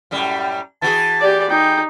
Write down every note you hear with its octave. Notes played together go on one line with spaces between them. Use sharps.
F#2 A2 G3
E3 F#4 G#4 A5
G4 D5
D#4 G5